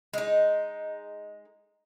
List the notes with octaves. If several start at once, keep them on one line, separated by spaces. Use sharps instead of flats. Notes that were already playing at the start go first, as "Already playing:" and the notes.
G#3 D#4